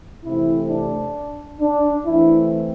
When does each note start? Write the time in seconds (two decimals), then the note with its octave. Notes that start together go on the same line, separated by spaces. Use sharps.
0.24 C3 E3 A3 C4 E4
0.71 D4
1.61 D4
2.06 E3 A3 C4 E4